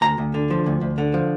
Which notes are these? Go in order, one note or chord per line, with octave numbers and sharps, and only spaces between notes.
D2 A#5
D2
D3
F3
D2
D2
D3
F3